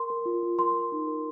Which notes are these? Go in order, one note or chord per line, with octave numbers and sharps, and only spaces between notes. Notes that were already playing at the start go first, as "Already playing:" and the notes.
Already playing: A#4 C6
A#4
F4
F4
A#4 C6
A#4
D#4
A#4